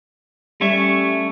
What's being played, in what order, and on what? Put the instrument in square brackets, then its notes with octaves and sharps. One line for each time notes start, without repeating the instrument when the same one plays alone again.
[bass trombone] G3 [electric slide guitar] A3 C#4 E5